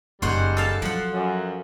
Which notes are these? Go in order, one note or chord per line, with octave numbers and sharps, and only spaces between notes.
F#1 D#3 G3 G#3 C5 C#5 F#5
A4 F5 A5
F3 F#3 F#5
F#2